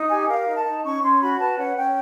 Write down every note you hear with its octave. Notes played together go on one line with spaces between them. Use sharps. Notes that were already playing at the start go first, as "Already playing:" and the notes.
Already playing: D#4
G4 G#5
A#4 F5
D#4
A5
D#4
C#4 C#6
C#4 C6
F#4 B5
B4 A5
C#4 F#5
C#4 G5